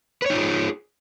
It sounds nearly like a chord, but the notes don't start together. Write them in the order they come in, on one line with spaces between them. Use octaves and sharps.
B4 C#5 D#4 F4 G#4